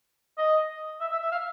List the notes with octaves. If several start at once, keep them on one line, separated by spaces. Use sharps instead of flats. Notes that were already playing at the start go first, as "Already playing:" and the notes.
D#5
E5
E5
E5
F5